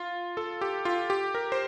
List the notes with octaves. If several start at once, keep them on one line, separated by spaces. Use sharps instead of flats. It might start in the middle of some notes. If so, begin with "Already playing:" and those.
Already playing: F4
A4
G4
F4
G4
A#4
C5